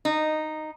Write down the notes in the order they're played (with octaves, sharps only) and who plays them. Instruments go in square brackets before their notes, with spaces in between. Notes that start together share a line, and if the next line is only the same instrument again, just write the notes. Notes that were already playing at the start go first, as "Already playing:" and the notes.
[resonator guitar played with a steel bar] D#4